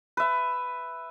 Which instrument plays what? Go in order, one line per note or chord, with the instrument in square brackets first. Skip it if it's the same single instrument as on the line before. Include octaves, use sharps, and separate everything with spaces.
[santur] B4 E5